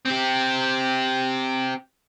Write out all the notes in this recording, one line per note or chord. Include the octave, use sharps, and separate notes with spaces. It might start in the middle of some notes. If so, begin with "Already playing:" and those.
C4 G4